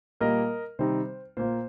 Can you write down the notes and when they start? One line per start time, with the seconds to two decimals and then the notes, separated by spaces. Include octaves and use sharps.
0.20 A#2 G3 A#3 A#4 D#5
0.79 C3 D#3 G3 C4 D#4 C5
1.37 A#2 A#3 F4 C5